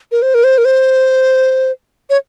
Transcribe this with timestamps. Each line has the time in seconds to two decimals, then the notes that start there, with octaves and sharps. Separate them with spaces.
0.12 A#4
0.22 C5
0.34 A#4
0.44 C5
0.58 A#4
0.65 C5
2.10 C#5